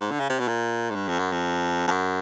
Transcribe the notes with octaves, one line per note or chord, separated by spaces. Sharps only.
G#2
D3
C#3
C3
B2
A#2
G#2
G2
F2
F#2
F2
F2
F#2